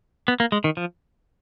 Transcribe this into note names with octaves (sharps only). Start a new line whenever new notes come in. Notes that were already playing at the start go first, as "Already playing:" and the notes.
B3
A#3
G#3
D#3
F3